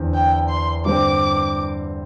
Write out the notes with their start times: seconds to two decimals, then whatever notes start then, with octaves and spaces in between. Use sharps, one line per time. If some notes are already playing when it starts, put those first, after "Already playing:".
Already playing: E2 D3 C4
0.14 G5
0.49 C6
0.85 G2 D3 C4 D6